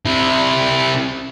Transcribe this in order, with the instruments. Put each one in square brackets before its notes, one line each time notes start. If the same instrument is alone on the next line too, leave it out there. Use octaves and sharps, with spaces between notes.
[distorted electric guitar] C3 E4